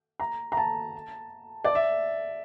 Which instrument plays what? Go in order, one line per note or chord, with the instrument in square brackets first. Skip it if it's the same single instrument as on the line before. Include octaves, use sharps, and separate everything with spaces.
[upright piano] A#5
A#5
A5
D5
E5